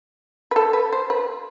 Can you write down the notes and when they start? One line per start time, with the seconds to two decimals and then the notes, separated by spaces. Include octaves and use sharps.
0.51 B4
0.56 A4
0.73 B4
0.93 C5
1.10 B4